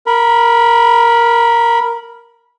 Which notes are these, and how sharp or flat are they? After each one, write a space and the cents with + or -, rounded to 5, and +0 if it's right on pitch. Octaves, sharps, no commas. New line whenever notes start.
A#4 +0 B5 -20